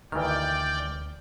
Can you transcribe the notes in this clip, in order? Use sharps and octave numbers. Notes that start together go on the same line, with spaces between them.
D2 D#3 E3 D5 G5 F6